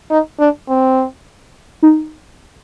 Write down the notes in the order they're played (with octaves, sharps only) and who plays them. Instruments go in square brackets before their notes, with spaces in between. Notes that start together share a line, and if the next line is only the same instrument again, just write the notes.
[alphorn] D#4
D4
C4
[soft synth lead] D#4